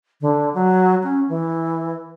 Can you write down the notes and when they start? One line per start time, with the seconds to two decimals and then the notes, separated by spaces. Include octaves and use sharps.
0.21 D3
0.54 F#3
1.03 C#4
1.29 E3